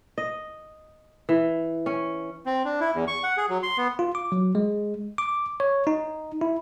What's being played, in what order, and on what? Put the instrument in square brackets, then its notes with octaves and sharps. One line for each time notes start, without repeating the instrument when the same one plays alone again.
[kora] D#5
E3
C#4
[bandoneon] C4
D4
E4
E2
C#6
F#5
G#4
F#3
C6
B3
[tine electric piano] F4
D6
F#3
G#3
D6
C#5
D#4
E4